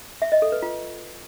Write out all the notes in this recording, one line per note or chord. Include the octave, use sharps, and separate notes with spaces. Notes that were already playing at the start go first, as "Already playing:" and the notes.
E5
D#5
A4
B4
F4